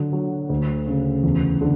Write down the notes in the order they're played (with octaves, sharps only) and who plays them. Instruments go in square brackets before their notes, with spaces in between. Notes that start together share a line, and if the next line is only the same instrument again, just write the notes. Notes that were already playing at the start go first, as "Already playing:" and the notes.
Already playing: [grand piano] D3 F#3
F#3
D2
C#3
E2
D3